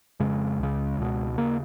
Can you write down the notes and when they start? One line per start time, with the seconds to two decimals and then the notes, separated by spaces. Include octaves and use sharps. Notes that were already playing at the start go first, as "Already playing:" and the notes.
0.20 F2 C#3 G#3
0.60 C#2 C#3
0.98 C#2 B2
1.38 D#2 C#3 A#3